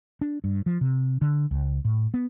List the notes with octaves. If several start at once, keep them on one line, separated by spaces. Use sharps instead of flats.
D4
G2
F3
C3
D3
C#2
A2
B3